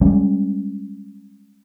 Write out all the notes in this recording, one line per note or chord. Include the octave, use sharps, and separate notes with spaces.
G3 G#3 C#4